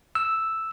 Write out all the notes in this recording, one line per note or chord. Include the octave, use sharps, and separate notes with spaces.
E6